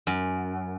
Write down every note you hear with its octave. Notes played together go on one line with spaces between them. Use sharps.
F#2